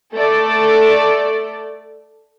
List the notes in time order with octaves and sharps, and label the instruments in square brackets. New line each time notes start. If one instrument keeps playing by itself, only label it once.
[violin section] A3 A4 D5